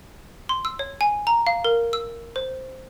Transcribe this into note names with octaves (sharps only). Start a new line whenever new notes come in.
C6
E6
C#5
G#5
A#5
F5
A#4
E6
C5